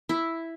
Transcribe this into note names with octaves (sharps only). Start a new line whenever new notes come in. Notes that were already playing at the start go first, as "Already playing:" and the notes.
E4